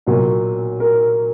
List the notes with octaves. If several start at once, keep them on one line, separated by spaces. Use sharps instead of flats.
B1 A#2 F#3
A#4